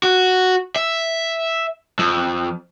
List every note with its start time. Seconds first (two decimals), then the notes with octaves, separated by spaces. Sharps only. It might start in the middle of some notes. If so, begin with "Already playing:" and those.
0.03 F#4
0.76 E5
1.99 F2